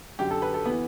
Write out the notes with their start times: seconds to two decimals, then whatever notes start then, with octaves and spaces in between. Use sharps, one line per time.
0.19 F#2 D3 G4
0.31 A4
0.42 B4
0.54 A4
0.65 E3 B3